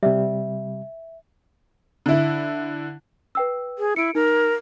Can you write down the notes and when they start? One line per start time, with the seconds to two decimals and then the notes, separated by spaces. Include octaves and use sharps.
0.03 C3 G3 E5
2.06 D3 E4
3.35 B4 G5 E6
3.79 G#4
3.96 E4 C#7 D7
4.15 D#4 A#4